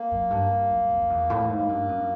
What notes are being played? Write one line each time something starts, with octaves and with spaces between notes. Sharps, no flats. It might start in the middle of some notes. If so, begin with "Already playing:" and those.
Already playing: A#3
F#2
G2
G2
F#2
F2
F2
E2
A2
G#2 A#3
G2
F#2